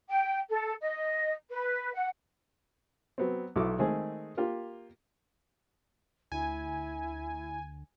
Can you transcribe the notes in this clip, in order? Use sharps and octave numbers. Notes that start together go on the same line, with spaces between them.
G5
A4
D#5
B4
F#5
F#3 B3 C4
B1 E4 F#4 A4 D6
D#3 G#3 A3 C4 G#4
A#3 F4 G4
D2 E4 G#5